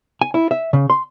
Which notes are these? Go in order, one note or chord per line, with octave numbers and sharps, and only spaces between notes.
G#5
E4
E5
C#3
C6